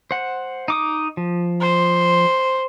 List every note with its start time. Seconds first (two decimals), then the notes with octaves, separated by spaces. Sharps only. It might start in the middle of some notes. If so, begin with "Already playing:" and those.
0.11 C5 F#5
0.68 D#4 D6 D#6
1.17 F3
1.61 C5